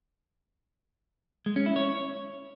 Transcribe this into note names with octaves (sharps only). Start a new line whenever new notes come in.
G#3
C#4
E4
C#5